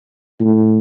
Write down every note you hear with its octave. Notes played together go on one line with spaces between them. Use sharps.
A2